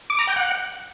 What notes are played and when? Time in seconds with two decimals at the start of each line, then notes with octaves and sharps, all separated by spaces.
0.10 D6
0.19 A#5
0.27 G5
0.36 F#5